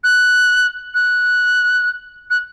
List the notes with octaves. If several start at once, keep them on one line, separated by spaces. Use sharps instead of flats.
F#6
F#6
F#6